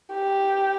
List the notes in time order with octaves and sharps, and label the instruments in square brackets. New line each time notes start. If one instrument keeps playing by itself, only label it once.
[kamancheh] G4